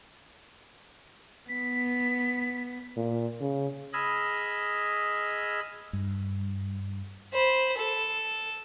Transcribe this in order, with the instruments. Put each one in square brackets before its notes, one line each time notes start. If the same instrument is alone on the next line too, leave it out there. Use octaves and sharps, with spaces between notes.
[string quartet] B3 [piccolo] B6
[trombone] A#2
C#3
[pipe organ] G#4 D#5 B5 E6 F6 G#6
[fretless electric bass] G2
[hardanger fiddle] C5 B5
A4